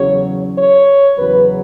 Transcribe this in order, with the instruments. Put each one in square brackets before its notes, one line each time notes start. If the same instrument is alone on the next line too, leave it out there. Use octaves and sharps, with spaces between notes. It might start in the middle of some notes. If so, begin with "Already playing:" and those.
Already playing: [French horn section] E2 C#3 F#3 C#5
C#5
E2 C#3 F#3 B4